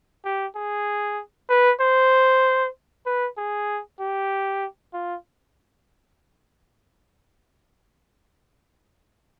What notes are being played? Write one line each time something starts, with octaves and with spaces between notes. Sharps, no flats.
G4
G#4
B4
C5
B4
G#4
G4
F4